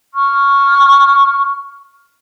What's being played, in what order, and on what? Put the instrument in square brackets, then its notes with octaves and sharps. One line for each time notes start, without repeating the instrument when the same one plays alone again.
[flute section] C#6 F6